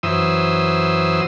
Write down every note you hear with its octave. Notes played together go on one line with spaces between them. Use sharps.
F#2 E3 C5 D#6 E6